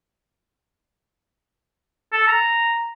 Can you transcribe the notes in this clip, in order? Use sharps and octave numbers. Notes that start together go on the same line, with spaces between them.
A4
A#5